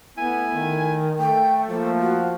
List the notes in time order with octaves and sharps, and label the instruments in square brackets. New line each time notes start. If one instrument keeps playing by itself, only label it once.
[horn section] A3 E4 G#5 [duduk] B3
[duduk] D#3
[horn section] A3 [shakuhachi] G5
[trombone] F3 [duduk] A#3 [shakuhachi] C5
[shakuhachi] F#4